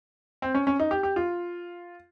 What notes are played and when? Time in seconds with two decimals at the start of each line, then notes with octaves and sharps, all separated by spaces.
0.42 C4
0.55 C#4
0.67 C#4
0.80 D#4
0.91 G4
1.03 G4
1.16 F4